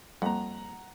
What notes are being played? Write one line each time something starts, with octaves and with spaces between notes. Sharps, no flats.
F2 G3 A#3 F#5 A#5